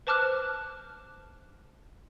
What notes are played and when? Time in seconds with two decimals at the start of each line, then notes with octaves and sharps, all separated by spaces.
0.07 B4 C5 A5 D6 F6 F#6